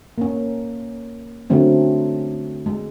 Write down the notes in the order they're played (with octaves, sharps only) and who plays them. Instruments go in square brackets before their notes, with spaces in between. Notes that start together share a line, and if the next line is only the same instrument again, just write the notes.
[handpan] A#3 C#4
D3 F#3 A3 C4 C#4
G#3